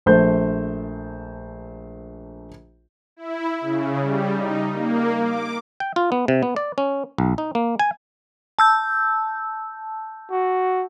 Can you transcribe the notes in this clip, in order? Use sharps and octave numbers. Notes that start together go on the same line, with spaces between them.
A#1 A3 C5 G6
E4
C#3
G3
D#4
A#3
D6
G5
F4
B3
C3
B3
D5
C#4
B1
D#4
A#3
G#5
A5 E6 G6
F#4